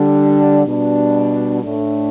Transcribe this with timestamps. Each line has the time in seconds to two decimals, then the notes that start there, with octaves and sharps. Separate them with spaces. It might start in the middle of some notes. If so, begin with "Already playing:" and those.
Already playing: D3 G3 D4
0.67 B2 G3 D4
1.62 A2 A3 D4